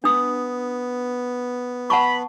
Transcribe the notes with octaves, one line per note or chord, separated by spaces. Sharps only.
B3 D4 D#6
F#5 A5 B5 C#6